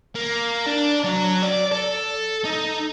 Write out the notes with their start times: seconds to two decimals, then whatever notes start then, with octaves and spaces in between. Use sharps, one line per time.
0.15 A#3
0.67 D4
1.04 F#3
1.43 D5
1.72 A4
2.45 D#4